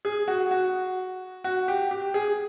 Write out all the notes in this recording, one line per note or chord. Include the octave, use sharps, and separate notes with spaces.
G#4
F#4
F#4
F#4
G4
G4
G#4